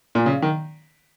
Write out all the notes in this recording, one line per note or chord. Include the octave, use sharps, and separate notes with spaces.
A#2
C#3
D#3